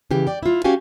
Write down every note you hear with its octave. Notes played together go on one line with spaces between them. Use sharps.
C#3 E3 G4
D5 G5
E4 F4
C#4 F#4 G4 F5 G#5